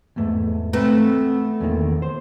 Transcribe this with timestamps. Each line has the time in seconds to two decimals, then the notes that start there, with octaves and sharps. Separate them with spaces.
0.16 E2 G#2 A3
0.73 A3 B3 C4 A#5
1.60 E2 A#2 D#3
2.02 C5